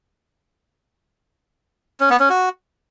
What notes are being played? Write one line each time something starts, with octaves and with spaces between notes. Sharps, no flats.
C#4
B3
C#4
F#4